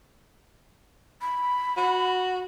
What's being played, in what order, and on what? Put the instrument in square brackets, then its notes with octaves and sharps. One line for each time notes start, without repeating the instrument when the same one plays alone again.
[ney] B5
[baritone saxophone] F#4